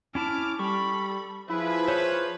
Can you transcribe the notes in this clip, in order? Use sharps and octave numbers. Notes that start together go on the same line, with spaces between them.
C#4 E4 A5 D6 F6
G3 A4 B5 C#6
F3 E4 G#4 B4 E5
C5 C#5